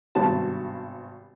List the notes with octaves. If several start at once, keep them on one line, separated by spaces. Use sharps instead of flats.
G#1 G2 C3 B3 F#4 A5